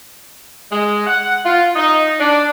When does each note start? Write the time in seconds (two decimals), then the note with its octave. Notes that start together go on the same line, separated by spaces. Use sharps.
0.70 G#3
1.07 F#5
1.45 F4
1.76 D#4
2.19 D4